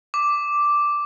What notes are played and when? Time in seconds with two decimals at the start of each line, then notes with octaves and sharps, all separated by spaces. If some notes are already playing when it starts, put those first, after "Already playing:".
0.14 D6